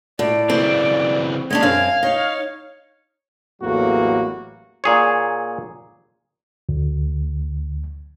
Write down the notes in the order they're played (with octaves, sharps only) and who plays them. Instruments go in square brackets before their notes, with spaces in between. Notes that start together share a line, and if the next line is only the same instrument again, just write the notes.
[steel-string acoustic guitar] A2 [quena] D5
[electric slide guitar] C#3 E3 F#3 [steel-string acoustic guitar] C4
[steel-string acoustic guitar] G#3 C#4 D4 [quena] G#6
[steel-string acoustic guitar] F#2 C4 [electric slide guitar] F5
[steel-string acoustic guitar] D#4 [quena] C#5
[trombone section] A1 E2 A2 F#3 A#3 F#4
[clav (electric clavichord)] A#2 G#4 C#5
[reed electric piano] D2